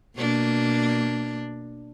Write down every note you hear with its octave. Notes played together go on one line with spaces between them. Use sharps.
B2 A#3 D4